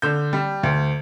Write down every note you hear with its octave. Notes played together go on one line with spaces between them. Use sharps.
D3 G6
G3
D2